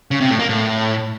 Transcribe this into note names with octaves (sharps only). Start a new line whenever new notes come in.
C#3
C3
A2
A#3
A2